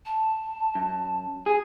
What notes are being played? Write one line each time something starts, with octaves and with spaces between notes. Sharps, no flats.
A5
F#2
G#4